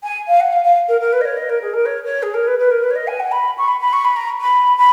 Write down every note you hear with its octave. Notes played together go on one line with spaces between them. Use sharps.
G#5
F5
F#5
F5
F5
A#4
A#4
B4
D#5
C#5
D#5
A#4
G#4
A#4
C#5
C#5
G#4
A#4
B4
B4
A#4
B4
C#5
D#5
G#5
F#5
B5
C#6
B5
B5
C#6
B5
A#5
B5
B5